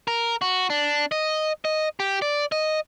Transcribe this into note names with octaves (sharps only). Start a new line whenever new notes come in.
A#4
F#4
D4
D#5
D#5
G4
D5
D#5